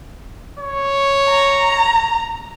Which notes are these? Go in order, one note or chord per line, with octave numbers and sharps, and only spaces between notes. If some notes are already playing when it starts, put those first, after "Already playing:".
C#5
A#5